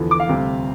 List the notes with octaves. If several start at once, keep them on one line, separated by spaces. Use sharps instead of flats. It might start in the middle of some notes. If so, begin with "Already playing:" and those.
Already playing: E2 D3 F3
D6
F5
D2 C3 G3